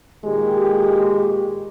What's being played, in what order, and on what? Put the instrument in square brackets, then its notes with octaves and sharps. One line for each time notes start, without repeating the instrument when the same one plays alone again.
[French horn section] A#2 D#3 G4 [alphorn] G#3